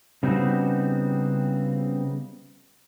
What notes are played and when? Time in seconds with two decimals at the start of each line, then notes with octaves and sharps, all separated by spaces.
0.23 C#3 G3 B3 C4 D#4 F#4